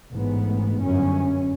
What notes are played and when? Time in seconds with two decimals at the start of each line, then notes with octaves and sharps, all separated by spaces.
0.13 A1 G#2 B3
0.82 G1 F#2 C#4